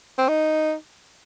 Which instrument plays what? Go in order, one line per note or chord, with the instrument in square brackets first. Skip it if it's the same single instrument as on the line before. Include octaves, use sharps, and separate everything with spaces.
[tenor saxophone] C4
D#4